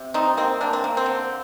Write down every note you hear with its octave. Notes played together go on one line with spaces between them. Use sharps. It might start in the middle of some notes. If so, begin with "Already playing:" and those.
Already playing: C3
G3 C4 D#4
A#3 C4
A#3 D4
C4
A#3
C4
D3